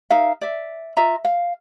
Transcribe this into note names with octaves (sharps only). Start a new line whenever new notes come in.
D#4 A#4 E5 F5
D5 E5
F4 D#5 E5 A#5
F5